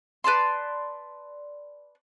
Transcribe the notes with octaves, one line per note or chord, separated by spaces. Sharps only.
B4 D5 A5 C6